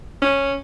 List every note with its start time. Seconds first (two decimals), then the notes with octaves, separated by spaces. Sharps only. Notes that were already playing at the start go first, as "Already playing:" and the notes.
0.22 C#4